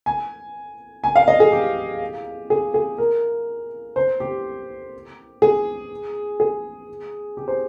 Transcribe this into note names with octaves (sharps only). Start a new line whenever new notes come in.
G#5
G#5
F5
D#5
G#4
G4
G#4
G#4
A#4
C5
G4
G#4
G#4
G4
C5